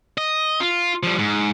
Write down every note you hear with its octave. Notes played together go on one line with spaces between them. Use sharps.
D#5
F4
F3 G3
G#2